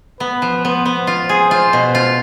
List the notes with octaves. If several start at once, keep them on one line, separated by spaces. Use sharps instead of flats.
B3 B4
F3
B3 C5
B3
F4
G#4
F4 C5
B2
F4